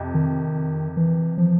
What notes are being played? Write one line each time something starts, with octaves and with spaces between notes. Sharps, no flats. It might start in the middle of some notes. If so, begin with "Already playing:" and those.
Already playing: F2 C3
D#3
E3
F3